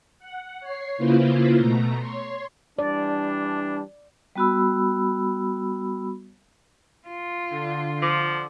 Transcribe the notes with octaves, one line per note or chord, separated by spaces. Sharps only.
F#5
C#5 C7
C#3 A#3 E4 F4 B4 C5
B2 A3 A#5
C#5 C6
E3 G3 D4 D5
G3 B3 F#4 B5 E6
F4
D3
F3 D6